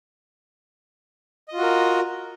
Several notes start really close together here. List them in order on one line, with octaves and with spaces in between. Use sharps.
D#5 F4 F#4 A#4